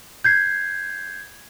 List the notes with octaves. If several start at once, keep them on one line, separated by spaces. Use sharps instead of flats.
G6 G#6 C7